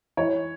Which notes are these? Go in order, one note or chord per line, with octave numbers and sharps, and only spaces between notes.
E3 C#5